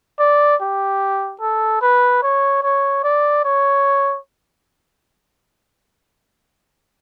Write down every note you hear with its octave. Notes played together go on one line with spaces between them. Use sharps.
D5
G4
A4
B4
C#5
C#5
D5
C#5